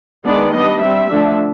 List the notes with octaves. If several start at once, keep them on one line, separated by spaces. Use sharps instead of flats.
D#3 G#3 B3 D4 D5
G3 B3 D4 D#5
G3 C4 E5
D3 F3 A3 D4